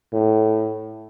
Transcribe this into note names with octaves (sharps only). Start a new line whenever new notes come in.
A2